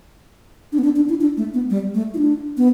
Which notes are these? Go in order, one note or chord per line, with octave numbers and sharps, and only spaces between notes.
D4
B3
D4
D4
E4
D4
A3
B3
G3
A3
E4
D4
B3